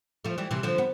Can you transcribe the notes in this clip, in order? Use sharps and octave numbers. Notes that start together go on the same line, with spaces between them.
F3 A3
E3 G3
C3 E3
D3 F3
B3